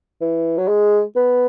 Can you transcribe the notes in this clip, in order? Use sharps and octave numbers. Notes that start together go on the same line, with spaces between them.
E3
F#3
G#3
B3